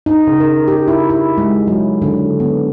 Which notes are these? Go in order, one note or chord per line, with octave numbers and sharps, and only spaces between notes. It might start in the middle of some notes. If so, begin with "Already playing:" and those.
D#4
C#3
A#4
G4
E4
E4
G#3
F#3
D3
B3